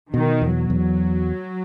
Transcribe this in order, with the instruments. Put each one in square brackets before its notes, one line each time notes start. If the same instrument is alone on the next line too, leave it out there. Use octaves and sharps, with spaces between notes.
[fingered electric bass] B2 [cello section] D#3
[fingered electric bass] E2
[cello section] F#3
[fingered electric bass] E2